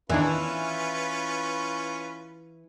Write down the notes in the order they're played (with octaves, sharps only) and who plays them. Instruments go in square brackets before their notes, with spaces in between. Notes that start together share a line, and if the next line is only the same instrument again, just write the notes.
[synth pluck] E2 D#3 D4 [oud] E3 [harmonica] C#4 F4 B4